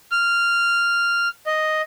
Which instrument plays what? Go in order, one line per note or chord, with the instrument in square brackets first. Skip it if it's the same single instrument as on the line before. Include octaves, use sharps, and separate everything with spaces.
[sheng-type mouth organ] F6
D#5